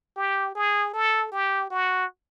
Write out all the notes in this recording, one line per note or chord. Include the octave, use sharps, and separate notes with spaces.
G4
G#4
A4
G4
F#4